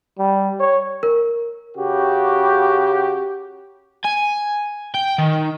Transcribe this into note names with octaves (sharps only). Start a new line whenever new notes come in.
G3
C#5
A#4
C#3 F#4 G4
G#5
G5
D#3